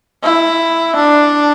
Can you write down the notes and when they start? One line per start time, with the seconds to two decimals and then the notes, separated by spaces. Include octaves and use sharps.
0.23 E4
0.96 D4